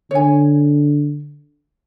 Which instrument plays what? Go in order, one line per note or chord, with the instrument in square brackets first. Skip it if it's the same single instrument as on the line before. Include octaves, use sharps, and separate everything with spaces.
[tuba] D3 [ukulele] C#5 G#5